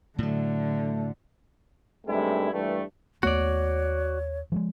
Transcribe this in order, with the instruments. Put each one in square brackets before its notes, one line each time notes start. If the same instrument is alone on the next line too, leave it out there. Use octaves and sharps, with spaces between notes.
[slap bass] A2 F#3 [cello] D3 [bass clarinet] A3
[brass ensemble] G2 C3 D#3 G#3 A3 E4
G2 A#2 E3 G3 A3
[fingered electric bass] D#2 A3 B3 [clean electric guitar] F#4 D5 [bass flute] C#5
[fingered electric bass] F3 G3 G#3